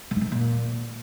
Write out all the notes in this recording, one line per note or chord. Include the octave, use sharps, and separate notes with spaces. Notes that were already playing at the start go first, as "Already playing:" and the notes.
B2
G#2
B2
G2
A#2